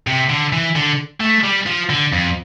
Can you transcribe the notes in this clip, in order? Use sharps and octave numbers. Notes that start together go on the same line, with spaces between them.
C3
D3
E3
D3
A3
G3
F3
D3
F2